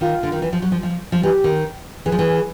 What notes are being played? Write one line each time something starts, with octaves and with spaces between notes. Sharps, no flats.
D#3 F4
D3
D#3
E3
F3
F#3
F3
F3
F3
E3 G4
D#3
E3 G#4
F3
E3